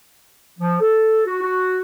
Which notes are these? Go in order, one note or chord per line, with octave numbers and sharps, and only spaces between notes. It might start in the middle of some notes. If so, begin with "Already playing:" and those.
F3
A4
F#4
F#4